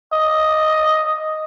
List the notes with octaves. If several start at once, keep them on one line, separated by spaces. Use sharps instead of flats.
D#5